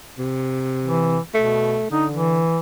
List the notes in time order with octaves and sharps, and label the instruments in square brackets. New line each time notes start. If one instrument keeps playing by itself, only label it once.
[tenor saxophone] C3
[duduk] E3
[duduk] B2 [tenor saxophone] A3
[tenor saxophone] D3 [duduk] D#4
[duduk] E3